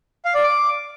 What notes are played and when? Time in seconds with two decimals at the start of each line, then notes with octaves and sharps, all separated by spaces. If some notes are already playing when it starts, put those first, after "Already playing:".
0.25 F5
0.34 D5
0.44 D6